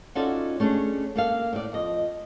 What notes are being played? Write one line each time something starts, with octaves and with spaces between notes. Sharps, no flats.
C#4 D#4 F4 F#4 A4 D5
A3 C#4 D4 G#4
A#3 A4 F5
A2 D5
F2 D#5